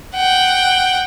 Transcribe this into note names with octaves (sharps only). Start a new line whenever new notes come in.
F#5 G5